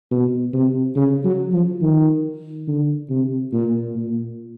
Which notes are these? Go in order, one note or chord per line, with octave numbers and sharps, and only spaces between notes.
B2
C3
C#3
F#3
F3
D#3
D3
C3
A#2
A#2